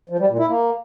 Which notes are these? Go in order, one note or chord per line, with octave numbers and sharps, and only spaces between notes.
F3
G3
A#2
E4
A#3